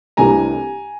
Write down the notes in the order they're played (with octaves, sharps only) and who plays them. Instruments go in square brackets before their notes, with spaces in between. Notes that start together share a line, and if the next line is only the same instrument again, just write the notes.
[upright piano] C2 C3 E3 A3 D4 G#5 A#5